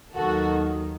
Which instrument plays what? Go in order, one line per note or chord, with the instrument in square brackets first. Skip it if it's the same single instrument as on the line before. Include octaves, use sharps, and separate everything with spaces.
[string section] D#2 D#3 F#3 F#4 A4